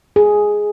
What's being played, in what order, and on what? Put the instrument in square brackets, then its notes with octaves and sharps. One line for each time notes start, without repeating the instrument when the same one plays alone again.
[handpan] G#4